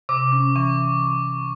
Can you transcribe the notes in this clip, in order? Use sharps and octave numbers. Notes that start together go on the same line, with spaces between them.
C3 D6
C#4
E3 C#6